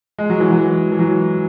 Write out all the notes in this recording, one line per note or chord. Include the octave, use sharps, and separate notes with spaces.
G#3
F#3
E3
F#3
E3
F#3